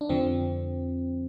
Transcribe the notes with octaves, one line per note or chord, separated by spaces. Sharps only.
D4
F2 D3 F3 C4